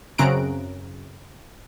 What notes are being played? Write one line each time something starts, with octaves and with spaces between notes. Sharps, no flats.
F#2 C#3 C4 A#5 F#6 D7